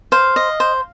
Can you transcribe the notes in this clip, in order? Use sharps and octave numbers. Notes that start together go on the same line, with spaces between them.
C5 F5
D#5
C5